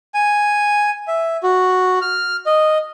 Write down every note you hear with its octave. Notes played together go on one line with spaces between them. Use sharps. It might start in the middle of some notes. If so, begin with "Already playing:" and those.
G#5
E5
F#4
F6
D#5